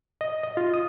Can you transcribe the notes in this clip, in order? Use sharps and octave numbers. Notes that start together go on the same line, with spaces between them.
D#5
D#5
F4
D#6